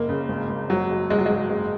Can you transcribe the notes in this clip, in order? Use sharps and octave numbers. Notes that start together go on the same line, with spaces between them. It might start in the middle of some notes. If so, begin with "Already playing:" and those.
Already playing: F#1 A#3
C#3
G#1
G#1
F#1 F#3
F#1
G#1 G#3
F#3
G#1 G#3
F#1